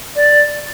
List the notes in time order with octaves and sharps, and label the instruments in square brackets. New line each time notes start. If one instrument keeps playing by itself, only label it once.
[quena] D5